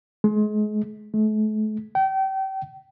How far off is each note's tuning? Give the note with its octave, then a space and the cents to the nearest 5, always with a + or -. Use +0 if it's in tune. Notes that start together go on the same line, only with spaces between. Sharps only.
G#3 +30
A3 -40
G5 -30